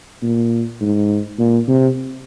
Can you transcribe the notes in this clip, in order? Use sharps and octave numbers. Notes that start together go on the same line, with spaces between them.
A#2
G#2
A#2
C3